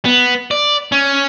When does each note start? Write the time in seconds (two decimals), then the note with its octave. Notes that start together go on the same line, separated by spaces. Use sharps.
0.05 B3
0.51 D5
0.92 C#4